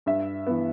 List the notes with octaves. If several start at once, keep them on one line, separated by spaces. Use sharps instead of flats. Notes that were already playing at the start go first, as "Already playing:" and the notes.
G2 E5
E3 B3